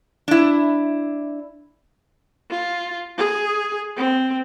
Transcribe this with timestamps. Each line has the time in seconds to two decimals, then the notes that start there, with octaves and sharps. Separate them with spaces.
0.28 D4 E4
2.50 F4
3.18 G#4
3.97 C4